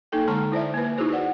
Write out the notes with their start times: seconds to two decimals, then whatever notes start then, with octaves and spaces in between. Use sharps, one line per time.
0.12 A#3 D#4 A4 G5
0.28 D3 G#3 A5 A#5 C#6
0.52 E4 C5 D5 E5
0.74 A#3 B4
0.98 D#4 E4 F#4 G#4 C5
1.13 D5 F#5